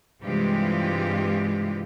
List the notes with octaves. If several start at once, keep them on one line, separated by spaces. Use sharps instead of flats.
G2 C3 E3 G#3 F4 G4